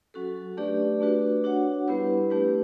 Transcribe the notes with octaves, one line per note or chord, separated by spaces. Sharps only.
F#3 C#4 F#4 A4
A3 D4 G4 B4 D5
A3 D4 F#4 B4
D4 F#4 C#5 F#5
G3 B3 E4 G4 B4
A3 D4 G4 B4